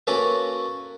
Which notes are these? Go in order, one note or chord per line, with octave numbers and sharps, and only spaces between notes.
A#3 C#4 F#4 A4 B4